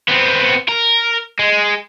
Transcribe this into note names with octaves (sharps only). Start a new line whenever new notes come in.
B3 C4
A#4
G#3